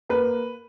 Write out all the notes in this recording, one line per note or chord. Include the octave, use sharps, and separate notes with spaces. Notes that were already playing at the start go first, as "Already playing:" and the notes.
A#3 B4